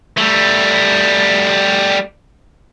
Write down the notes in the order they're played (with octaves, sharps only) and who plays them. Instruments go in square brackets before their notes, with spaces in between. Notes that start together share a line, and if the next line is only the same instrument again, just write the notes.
[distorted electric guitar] G3 A3